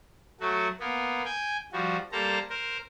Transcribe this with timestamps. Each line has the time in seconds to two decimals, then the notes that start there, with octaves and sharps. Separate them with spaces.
0.40 F#3 A3 F#4
0.80 A#3 B3
1.25 G5 G#5
1.73 F3 G3 F#4
2.12 G3 A#3 A4 C5 A#5
2.50 A#4 C5